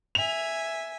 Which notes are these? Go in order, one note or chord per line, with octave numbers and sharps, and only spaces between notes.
E5 G#5 F7